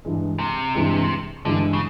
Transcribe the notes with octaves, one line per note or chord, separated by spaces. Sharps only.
G2 E3 G#3
C3
G2 E3 G#3
G2 D3 E3 G#3
C#3